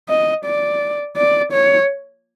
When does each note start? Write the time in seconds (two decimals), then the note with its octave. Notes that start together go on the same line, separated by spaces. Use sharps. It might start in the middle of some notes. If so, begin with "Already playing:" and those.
0.09 D#5
0.45 D5
1.17 D5
1.52 C#5